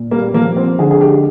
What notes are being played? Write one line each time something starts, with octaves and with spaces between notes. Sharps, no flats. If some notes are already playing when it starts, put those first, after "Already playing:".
Already playing: A#2
G3 A#3
F3 A#3
F3 C4
D3 G#4
G#4
G#3 G4